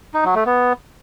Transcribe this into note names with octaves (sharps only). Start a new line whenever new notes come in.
D#4
F#3
A3
B3